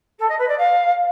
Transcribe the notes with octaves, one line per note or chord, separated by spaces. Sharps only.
A4
D#5
B4
D5
F5